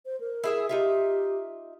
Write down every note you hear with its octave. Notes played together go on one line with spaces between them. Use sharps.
C5
A#4
E4 G#4 E5
D#4 F4 G4 E5